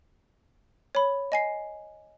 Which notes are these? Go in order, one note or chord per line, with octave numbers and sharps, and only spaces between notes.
C#5 B5
D#5 G#5 C7